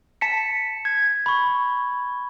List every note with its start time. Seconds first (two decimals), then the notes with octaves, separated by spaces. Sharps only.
0.21 A5 B6 C#7
0.85 G#6
1.26 B5 C#6